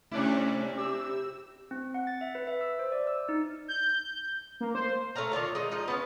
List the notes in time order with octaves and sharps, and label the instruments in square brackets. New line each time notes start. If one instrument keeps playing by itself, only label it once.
[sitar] C3 D4 E4 [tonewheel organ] A3 [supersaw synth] C#4 D5
[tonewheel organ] G4 [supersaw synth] E6
[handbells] C4
F#5
A6
E5
B4
E5
E6
C5
D5
E6
D#4
[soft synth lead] G6
A#3
C5
[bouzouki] A3 C#5 F5 A#5
D#3 D4 F4 C#5
G#3 D#4
F3 D#4 F4
B3 C#4 F5